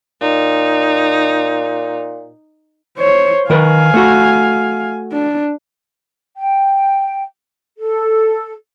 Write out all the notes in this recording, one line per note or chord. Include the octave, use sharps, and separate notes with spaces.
A#2 D#4
C5 C#5
D#3 A#4 B4 F5 G#5
A3 F#4
D4
G5
A4